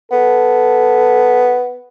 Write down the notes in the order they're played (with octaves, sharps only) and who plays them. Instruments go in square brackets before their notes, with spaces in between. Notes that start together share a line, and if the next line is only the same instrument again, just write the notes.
[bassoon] B3 [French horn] A4